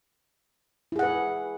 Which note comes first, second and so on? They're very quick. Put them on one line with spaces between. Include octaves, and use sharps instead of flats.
E4 G#4 F#5 B4